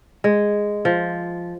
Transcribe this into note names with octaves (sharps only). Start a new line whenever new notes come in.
G#3
F3